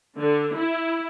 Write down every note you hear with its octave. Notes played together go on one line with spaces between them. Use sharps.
D3
E4